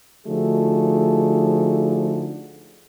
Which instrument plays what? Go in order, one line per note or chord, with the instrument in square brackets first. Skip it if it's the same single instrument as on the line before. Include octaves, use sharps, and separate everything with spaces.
[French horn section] D3 F3 A3 D#4 F#4 G#4